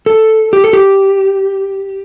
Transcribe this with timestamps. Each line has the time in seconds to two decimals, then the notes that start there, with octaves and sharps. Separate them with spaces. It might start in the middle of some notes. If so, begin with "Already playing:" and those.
0.06 A4
0.53 G4
0.64 A4
0.73 G4